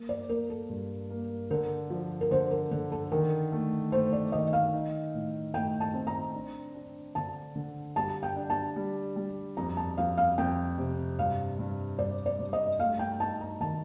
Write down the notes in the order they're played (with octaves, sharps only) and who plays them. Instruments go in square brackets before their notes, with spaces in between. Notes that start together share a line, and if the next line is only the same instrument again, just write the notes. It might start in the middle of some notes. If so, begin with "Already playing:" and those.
Already playing: [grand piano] A#3
[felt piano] D5
[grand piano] A#3 [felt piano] A#4
[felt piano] A4
[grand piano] G2
A#3
[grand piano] D3 [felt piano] A#4
[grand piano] F3
[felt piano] A#4
[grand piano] D3 [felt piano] C5
[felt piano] A#4
[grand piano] D3 [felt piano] A4
[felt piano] A4
[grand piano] D#3 [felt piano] A#4
[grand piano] A3
[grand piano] A3 [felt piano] C5
[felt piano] D5
[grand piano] D#3 [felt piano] D#5
[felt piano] F5
[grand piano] D#4
A2
[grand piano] A3 [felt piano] G5
[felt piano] A5
[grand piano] C4
[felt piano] A#5
[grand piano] D4
D4
[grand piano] D3 [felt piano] A5
[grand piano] D3
[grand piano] G3 [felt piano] A5
[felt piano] G5
[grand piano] D4
[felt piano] A5
[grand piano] G3
G3
[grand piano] F2 [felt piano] A#5
[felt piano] A5
[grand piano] F2 [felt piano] F5
[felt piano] F5
[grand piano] F2 [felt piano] G5
[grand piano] C3
[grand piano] G2 [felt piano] F5
[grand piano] G2
[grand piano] G2 [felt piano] D5
[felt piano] D5
[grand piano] G2
[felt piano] D#5
[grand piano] A3 [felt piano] F5
[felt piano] G5
[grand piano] D#4 [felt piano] A5
[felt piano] A#5
[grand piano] D#3 [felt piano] A5